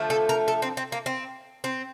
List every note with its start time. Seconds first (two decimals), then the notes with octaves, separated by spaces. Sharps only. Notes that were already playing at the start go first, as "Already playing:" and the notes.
Already playing: D3 F3 A3
0.10 A4
0.29 A#4
0.48 A4
0.62 C4
0.77 C4
0.92 A#3
1.06 C4
1.64 C4